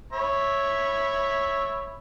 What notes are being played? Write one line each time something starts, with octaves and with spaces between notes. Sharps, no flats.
C#5 E5 B5